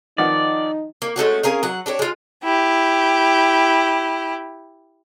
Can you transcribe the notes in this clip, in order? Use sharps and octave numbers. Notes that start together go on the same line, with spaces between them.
D#3 F3 D#4 D5 F#5
A#3
G#3 A3 C#4 F#4
C#4 G#4 A#4 F5
F#3 F#5
D4 G4 A#4 C#5
G#3 F4
E4 G4